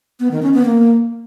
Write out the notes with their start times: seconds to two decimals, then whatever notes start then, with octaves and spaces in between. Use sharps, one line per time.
0.20 B3
0.31 D#3
0.42 C#4
0.54 B3
0.65 A#3